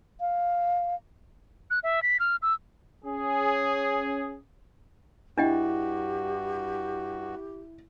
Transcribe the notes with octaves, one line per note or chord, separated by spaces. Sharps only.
F5
F#6
E5
B6
F6
E6
C#4 G#4
G2 D4 E4 F#4 G4 D#5 G5